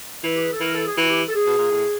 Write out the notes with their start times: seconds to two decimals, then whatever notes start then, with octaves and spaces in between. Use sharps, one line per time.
0.24 E3 B4
0.35 G4
0.43 G#4
0.53 A4
0.60 E3 A#4
0.74 A4
0.86 G#4
0.97 E3 F#4
1.10 G4
1.28 A4
1.35 G#4
1.46 B2
1.58 A#2
1.71 A2